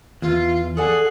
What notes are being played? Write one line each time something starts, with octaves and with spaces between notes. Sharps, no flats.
E2 F4
G#4 A4 D5 F#5 G#5 D#6